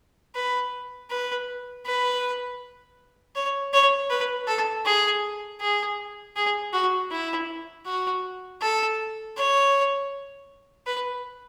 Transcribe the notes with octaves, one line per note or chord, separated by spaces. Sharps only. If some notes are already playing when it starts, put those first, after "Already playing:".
B4
B4
B4
C#5
C#5
B4
A4
G#4
G#4
G#4
F#4
E4
F#4
A4
C#5
B4